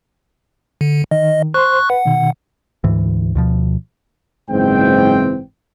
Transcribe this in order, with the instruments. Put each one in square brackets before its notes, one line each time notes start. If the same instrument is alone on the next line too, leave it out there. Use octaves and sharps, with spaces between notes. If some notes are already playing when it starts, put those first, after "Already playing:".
[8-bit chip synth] D3
[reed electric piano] D#3 [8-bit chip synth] D#5
[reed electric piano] C5 C6 [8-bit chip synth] C#6 F#6
[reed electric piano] B4 [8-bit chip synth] F#5
[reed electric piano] B2 D#3
[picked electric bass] D2 G#2 E3
D2 B2 F3
[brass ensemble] F#1 G#2 E3 C4 G5